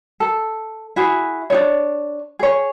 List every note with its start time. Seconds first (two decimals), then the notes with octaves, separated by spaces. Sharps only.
0.20 A4
0.96 E4 F#4 G#4
1.50 D4 D#4 C#5
2.39 G#4 C#5